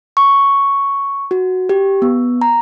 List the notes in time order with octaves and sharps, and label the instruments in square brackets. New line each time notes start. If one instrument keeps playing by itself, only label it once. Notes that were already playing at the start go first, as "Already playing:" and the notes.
[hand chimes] C#6
F#4
G4
B3
A#5